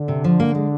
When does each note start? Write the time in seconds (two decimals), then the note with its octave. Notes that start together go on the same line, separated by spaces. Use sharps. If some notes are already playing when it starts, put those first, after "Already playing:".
Already playing: D3
0.08 C3
0.24 F3
0.40 A#3
0.55 G#3